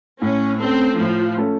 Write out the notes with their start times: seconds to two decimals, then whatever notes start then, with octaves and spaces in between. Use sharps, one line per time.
0.22 A2 C#4
0.60 A3 C4 C#4 A4
0.99 A2 F3
1.37 A3 C#4 A4